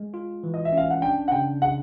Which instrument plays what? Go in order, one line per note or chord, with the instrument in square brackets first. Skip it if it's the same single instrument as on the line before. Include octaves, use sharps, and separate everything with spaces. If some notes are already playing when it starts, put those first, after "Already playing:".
Already playing: [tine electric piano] G#3
F4
E3
[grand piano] D#5
E5
[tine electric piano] C#4
[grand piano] F5
F#5
[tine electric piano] D4 [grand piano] G5
[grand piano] F#5
[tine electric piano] C#3 [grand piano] G5
[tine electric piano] C#3 [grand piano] F#5